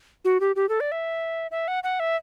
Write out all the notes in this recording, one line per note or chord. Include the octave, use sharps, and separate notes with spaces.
F#4
G4
G4
A4
D5
E5
E5
F#5
F#5
E5